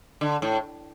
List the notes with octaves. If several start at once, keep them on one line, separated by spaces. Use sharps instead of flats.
D3
A2